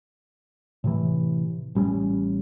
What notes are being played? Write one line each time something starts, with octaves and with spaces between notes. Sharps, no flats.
A2 C3 E3
A1 G3 A3 C#4